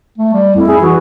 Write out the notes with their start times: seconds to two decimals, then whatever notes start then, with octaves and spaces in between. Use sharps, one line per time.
0.18 A3
0.33 G3
0.56 F2 E4
0.68 G#4
0.81 E3 F#4